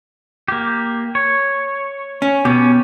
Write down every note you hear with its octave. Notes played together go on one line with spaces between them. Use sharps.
A#3 G4
C#5
C#4
B2 C#4 G4